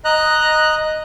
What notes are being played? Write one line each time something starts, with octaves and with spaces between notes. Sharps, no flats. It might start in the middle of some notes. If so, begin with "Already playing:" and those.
D#5 A#5 F#6